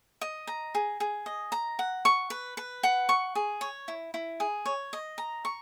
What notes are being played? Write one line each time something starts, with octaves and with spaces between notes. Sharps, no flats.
D#5
A#5
G#4
G#4
D#5
A#5
F#5
C#6
B4
B4
F#5
C#6
G#4
C#5
E4
E4
G#4
C#5
D#5
A#5
C#6